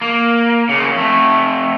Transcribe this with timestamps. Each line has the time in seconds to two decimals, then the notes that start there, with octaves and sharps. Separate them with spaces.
0.02 A#3
0.69 C#3 A#3
0.96 F2 A3